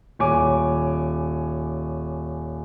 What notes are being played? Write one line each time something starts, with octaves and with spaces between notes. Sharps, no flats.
D#1 C#5 G#5 D6